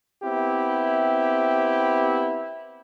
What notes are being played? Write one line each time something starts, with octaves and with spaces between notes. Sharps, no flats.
B3 C4 E4 G4